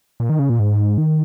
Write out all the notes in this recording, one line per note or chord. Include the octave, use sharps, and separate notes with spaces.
A#2
D#3
C#3
A#2
G#2
D#3